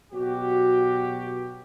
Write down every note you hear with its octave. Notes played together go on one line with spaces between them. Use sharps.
B2 F#3 F#4 G4